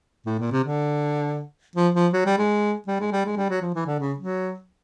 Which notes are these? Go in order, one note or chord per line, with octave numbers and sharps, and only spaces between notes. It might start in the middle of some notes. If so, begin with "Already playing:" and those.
A2
A#2
C3
D3
F3
F3
F#3
G3
G#3
G3
G#3
G3
G#3
G3
F#3
F3
E3
D3
C#3
F#3